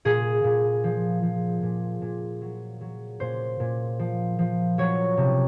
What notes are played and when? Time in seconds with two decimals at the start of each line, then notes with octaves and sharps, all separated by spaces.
0.05 A#2 G#4
0.44 A#2
0.84 F3
1.23 F3
1.63 A#2
2.02 A#2
2.41 F#3
2.81 F#3
3.20 A#2 C5
3.60 A#2
3.99 F3
4.39 F3
4.78 F#3 C#5
5.17 C3